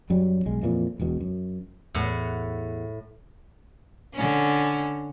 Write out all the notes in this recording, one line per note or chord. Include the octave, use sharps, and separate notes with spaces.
F#2 F#3 G3
B1 G#3
F2 A#2 E3
E1 E2 B2
F#2
E2 A2 F#5
D3 C#4